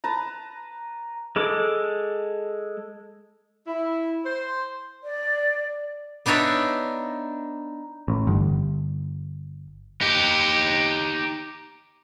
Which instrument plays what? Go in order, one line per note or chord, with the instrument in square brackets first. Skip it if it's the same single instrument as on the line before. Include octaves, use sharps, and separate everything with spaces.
[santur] B4 A5 A#5
[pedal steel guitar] G#3 A4 D6
[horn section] E4
C5
[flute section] D5
[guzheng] B3 D4 D#4 C#5 E5
[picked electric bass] A1
G1
[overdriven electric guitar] D#4 G4